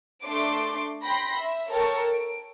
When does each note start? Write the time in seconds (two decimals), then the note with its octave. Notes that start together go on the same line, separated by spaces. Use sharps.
0.23 A3 D4 C6 D6 D7
1.03 G5 B5 C6 A#6
1.39 E5
1.70 A4 A#4 C#5 G5 A5 C#6
2.09 D7